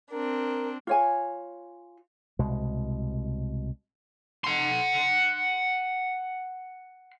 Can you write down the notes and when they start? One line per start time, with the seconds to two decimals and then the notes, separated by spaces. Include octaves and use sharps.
0.12 C4 D4 A#4
0.87 F4 C#5 G#5
2.39 C2 B2 G#3
4.44 F#5 C6